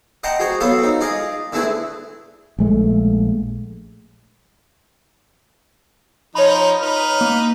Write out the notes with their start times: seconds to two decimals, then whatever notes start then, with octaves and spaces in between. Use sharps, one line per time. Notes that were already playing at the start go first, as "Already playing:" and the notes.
0.24 D#5 F#5 G5 A5 A#5 C6
0.40 F#4 G#4 C5
0.60 F#3 B3 F4 A4 C6
0.79 C4 D#4
1.01 F4 G#4 D5 D#5
1.52 D3 A3 C4 E4 G#4 B4
2.59 A#1 G#3 A3
6.35 F3 D#4 C#5 B5
6.80 D#4 B4 F6
7.21 A#3